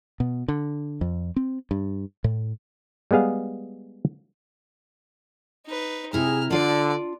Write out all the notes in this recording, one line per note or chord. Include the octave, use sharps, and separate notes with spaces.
B2
D3
F2
C4
G2
A2
G3 G#3 B3 G#4 F5
D#4 B4
C3 E4 G#4 A#5 F6
D3 D4 F4 D5